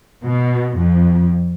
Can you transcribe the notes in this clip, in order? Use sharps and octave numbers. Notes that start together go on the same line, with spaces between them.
B2
F2